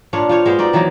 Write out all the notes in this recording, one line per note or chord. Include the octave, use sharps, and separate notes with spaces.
A#2 D4 F4 C#5
F4 C5 C#5
G#3 B3 C5
D#4 F#4 D5
D#3 E3 F#3 A#3